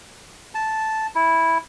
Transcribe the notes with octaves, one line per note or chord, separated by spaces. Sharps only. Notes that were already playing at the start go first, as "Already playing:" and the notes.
A5
E4